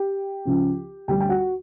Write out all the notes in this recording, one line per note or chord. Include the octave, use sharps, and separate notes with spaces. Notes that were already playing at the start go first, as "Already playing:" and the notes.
Already playing: G4 G5
C#2 C#3 F3
D2 D3 G3 G4 G5
G5
F#4 F#5